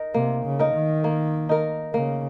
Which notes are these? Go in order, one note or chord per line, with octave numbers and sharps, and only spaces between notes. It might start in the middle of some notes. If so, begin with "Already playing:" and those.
Already playing: D#4 A#4
C3 A#3
C#3
D#4 A#4
D#3
A#3
D#4 A#4
C#3 A#3